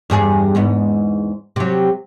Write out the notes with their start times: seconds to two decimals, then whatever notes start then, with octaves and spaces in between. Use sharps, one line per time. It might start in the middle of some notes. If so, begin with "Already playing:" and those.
0.10 E2 G2 G#4
0.55 E2 G#2 B3
1.56 C3 F#3